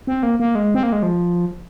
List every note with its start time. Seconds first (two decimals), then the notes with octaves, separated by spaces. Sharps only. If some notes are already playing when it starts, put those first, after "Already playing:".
0.07 C4
0.23 A#3
0.40 A#3
0.55 G#3
0.74 C4
0.83 A#3
0.92 G#3
1.03 F3